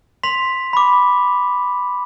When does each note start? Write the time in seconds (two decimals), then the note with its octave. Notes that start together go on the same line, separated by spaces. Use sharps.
0.23 C6 B6 F7
0.73 B5 D6